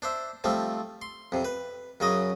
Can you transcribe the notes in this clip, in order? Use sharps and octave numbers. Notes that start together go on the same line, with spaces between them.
D4 C5 E5
F3 G3 A3 C4
C6
F2 C3
B4
F#2 C#3 F#3 D#5 D#6